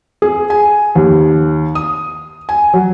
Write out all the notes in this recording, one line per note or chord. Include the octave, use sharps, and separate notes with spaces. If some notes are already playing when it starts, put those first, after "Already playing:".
G#4
G#5
D#2
D#6
G#5
F#3